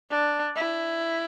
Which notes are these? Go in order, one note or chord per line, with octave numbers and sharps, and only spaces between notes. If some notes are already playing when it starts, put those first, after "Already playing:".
D4
E4